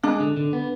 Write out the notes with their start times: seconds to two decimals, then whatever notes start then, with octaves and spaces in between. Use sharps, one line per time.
0.03 G#3 D4
0.20 D3
0.37 D3
0.53 B3